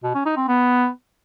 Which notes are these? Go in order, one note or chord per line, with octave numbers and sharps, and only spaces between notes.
B2
C#4
D#4
C4
B3